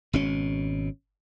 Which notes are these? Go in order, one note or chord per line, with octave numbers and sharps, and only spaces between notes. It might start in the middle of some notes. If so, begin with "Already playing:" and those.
G#1 B2 C#4